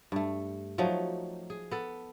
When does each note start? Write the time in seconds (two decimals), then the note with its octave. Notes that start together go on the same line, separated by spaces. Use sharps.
0.12 G2 A3
0.78 F3 F#3 A3 D#4
1.50 G#4
1.71 B3 A4